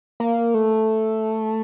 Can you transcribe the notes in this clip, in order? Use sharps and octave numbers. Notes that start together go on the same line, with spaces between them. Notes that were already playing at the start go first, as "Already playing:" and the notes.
A#3
A3